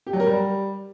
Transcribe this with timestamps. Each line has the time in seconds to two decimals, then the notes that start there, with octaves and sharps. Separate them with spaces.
0.07 G4
0.13 F#3
0.20 A#4
0.26 G3